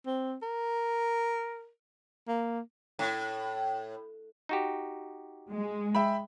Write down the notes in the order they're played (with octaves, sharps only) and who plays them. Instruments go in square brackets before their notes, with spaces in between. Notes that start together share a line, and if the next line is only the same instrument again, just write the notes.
[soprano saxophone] C4
A#4
A#3
[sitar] A2
[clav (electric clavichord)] D#4 F#4 G4
[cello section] G#3
[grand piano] E5 G5 B5